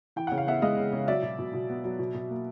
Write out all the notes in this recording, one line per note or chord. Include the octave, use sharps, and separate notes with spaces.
E3 G5
C#3 F#5
F5
B3 E5 F#5
G#3 D#5 F5
C#3
C#3
F#3 D5 E5
B2
B2
B2
B3
F#3
B2
B2
A#3